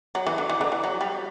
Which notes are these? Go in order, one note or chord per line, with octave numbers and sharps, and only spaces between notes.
F#3
E3
D3
E3
D3
E3
F#3
G3